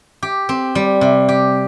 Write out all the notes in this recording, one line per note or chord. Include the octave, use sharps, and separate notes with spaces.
G4
C4
G3
C3
G4